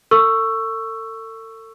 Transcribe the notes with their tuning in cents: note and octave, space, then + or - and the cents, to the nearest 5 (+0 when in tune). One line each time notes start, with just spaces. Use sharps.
A4 +40 C#6 +0 E6 +15